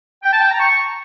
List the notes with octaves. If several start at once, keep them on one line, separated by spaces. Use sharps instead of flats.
G5
A5
G5
A#5
C#6